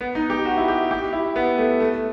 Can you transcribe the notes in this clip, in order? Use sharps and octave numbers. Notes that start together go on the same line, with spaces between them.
B3
D#4
G4
F#4
E4
G4
G4
E4
B3
A3
A3